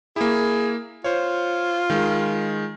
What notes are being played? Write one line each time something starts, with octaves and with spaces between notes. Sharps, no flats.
A#3 E4 G#4
F4 C5 C#5
D#3 G#3